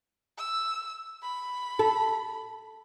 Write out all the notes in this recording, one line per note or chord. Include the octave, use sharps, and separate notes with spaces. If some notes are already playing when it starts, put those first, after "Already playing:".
E6
B5
A4